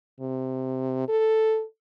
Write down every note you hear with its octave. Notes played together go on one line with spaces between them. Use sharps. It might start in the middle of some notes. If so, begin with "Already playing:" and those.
C3
A4